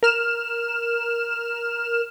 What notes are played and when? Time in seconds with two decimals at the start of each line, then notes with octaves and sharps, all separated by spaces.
0.03 A#4 F6 E7